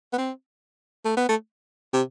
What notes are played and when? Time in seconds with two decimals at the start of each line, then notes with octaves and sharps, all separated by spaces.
0.13 B3
0.18 C4
1.05 A3
1.17 B3
1.29 A3
1.93 C3